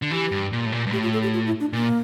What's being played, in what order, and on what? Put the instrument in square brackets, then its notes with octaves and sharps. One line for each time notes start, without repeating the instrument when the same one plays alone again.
[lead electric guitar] D3
[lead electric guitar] E3 [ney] G4
[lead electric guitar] G2
A#2
A2
A#2
G2
[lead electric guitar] A2 [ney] G4
[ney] F4
A4
G4
F4
E4
D4
[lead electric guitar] A#2 [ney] A#3